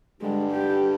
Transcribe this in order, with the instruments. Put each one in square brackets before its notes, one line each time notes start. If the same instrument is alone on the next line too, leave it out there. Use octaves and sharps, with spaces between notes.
[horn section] G2 D3 G3 [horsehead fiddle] G#3
[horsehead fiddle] G4